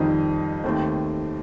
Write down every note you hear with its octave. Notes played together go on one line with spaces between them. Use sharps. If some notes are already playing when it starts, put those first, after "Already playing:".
Already playing: F2 D#3 G3 C4 D#4
D#2 D#3 A3 C4